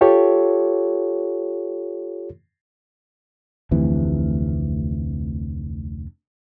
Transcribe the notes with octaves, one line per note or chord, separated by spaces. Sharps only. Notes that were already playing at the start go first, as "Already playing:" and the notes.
F4 G4 A4 C#5
F1 D2 C3 E3